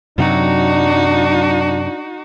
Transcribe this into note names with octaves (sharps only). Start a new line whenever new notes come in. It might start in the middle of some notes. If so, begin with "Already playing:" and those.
F#2 C3 F#3 D4 D#4 F#4